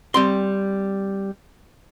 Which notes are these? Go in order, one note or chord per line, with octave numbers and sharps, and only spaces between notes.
G3 C4 C6